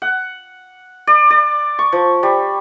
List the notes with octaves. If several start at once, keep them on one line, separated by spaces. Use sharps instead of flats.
F#5
D5
D5
C#6
F3
G3